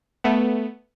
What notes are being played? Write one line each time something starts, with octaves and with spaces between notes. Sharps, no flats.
A3 B3